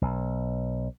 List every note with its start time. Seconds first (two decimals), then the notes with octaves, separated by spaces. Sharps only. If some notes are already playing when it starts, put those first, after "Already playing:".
0.02 B1